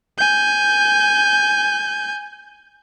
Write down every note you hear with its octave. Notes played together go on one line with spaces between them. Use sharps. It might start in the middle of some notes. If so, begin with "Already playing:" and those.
G#5 G6